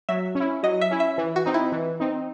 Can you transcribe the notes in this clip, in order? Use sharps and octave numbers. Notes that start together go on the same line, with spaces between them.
F#3 E5
C#4
E4
F#3 D#5
E5
C#4 E4
E5
E3
F#4
C4 D#4
E4
E3
C4 D#4